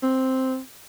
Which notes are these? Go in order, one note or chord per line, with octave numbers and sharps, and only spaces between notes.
C4